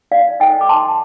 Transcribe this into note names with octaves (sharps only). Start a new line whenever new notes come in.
D5 F5
D#4 A4 C5 D#5 G5
D6
A5 C6